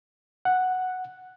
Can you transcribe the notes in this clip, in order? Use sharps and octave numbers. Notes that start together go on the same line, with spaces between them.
F#5